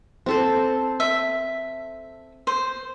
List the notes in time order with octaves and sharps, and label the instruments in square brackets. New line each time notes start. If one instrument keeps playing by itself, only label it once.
[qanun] C4 A4 C5
[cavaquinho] E5
C5